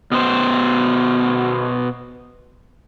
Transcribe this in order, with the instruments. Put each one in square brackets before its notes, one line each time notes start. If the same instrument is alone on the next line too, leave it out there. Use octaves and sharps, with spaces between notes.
[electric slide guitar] B2 B3 C5